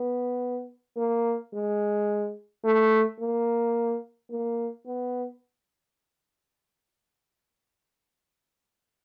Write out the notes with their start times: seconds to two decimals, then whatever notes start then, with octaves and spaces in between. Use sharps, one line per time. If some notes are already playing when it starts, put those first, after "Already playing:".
Already playing: B3
0.97 A#3
1.53 G#3
2.64 A3
3.20 A#3
4.30 A#3
4.86 B3